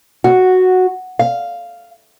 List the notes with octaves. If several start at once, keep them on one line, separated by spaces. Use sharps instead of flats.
F#4
F5